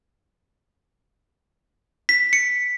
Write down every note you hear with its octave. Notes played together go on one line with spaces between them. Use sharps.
B6
C#7